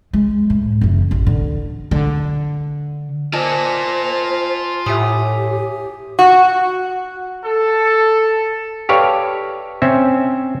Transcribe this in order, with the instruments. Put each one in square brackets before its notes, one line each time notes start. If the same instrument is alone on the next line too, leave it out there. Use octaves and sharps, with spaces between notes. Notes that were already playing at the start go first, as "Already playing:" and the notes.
[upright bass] G#3
A2
F#1 E3
A1
D3
D3
[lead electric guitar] F4 D5 [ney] C5 [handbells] D#5 G#5 A5
[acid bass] A2 [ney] G4 [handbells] E5 G#5 D#6
[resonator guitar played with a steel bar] F#4
[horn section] A4
[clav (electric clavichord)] G4 A4 B4 C#5 D5 F5
C4 C#4 E5